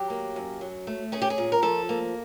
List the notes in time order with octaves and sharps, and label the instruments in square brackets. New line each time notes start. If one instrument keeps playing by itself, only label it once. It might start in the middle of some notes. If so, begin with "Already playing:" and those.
Already playing: [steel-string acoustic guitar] F#3 G4
A#3
F#2
F#3
A3
C#4 G#4
G4
G#4
A#2
A#4
F3 A4
A#3